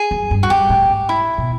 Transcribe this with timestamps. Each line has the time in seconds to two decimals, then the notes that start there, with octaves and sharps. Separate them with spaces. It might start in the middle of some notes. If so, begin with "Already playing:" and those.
Already playing: G#4
0.11 F#2
0.31 G2
0.43 F#4
0.50 G2 G4
0.70 A2
0.90 G#2
1.09 E4
1.38 B2